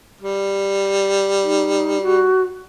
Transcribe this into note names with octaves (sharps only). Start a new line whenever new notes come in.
G3
D#4
F#4